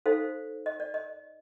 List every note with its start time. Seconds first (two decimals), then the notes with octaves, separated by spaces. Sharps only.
0.06 D#4 A4 C5 F5
0.66 D#5
0.80 D5
0.94 D#5